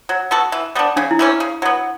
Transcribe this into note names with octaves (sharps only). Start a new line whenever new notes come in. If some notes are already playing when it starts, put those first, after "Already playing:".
F#3
B3 F#4 A4
E3
G3 B3 D4
C#3 D4
E4
E3 G3 C#4
C#3
F#3 B3